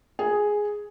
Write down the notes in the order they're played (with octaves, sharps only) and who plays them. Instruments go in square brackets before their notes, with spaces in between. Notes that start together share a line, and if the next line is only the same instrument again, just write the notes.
[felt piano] G#4